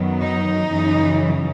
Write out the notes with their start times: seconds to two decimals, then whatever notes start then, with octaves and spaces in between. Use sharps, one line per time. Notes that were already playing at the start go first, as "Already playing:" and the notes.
Already playing: F#2 D#3 F#3 B3
0.22 D#4
0.69 F#2 C#3 E3